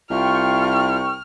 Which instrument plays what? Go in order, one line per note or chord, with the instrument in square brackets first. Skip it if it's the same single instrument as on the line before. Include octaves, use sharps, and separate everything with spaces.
[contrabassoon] C2 [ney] F4 [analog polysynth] G5 C#6 [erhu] F6